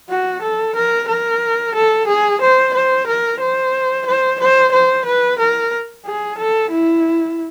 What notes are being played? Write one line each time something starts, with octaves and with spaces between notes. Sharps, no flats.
F#4
A4
A#4
A#4
A4
G#4
C5
C5
A#4
C5
C5
C5
C5
B4
A#4
G#4
A4
E4